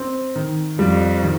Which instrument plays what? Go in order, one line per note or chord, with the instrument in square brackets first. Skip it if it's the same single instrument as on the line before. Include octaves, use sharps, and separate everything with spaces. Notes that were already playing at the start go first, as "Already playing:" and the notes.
Already playing: [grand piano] C4
D#3
[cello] F2 [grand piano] G3
[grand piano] D#3